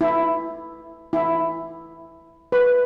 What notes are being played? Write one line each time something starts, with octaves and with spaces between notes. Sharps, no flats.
E4
E4
B4